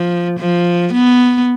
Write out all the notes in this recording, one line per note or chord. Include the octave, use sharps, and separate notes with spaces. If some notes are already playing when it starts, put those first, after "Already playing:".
Already playing: F3
F3
B3